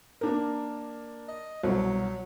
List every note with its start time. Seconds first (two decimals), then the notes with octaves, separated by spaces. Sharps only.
0.21 A#3 D4 A#4
1.29 D#5
1.63 C2 B2 F#3